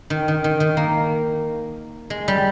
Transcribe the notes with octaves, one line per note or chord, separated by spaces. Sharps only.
D#3
D#3
D#3
D#3
A#3
G#3
G3